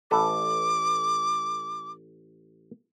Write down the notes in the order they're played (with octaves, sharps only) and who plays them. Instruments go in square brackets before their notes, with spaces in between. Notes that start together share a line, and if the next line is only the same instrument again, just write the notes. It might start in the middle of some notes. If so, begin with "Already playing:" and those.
[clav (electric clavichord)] A1 A4 B4 [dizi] D6